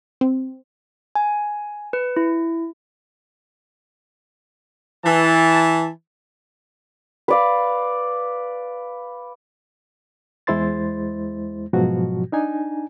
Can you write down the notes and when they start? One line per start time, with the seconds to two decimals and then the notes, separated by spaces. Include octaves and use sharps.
0.21 C4
1.15 G#5
1.93 B4
2.16 E4
5.05 E3 A5
7.28 B4 D5 F5
10.47 E2 G#3 E4 C5 C6 A6
11.73 G#2 B2 F3 F#3 F#4
12.32 D4 D#4 G#5